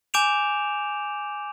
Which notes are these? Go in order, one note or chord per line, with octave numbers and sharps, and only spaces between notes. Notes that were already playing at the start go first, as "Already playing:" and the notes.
G#5 D6 G6 D7 E7 F7